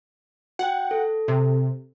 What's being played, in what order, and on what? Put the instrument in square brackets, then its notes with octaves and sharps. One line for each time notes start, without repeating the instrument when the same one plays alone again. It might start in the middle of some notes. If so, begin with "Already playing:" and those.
[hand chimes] F#4 G5 [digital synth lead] F#5
[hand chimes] A4
[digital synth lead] C3